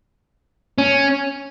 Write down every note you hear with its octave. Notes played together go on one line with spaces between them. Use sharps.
C#4